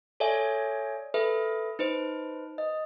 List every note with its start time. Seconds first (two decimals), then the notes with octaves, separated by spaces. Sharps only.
0.20 A4 C#5 D5 E5 G#5
1.14 A4 B4 E5
1.79 D#4 B4 C5
2.58 D#5